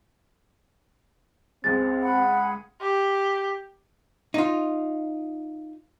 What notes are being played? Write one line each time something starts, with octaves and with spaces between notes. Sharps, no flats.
C#2 G#3 C4 A6
G#4 F#5 B5
G4
D#4 F4